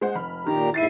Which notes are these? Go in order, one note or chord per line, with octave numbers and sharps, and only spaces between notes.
G#3 C5 F#5
F1 B5 F6
A#2 D#3 G4 A#5
D#2 G#2 E4 A6 C7 D#7